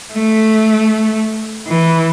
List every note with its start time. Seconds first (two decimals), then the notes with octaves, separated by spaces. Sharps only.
0.13 A3
1.67 E3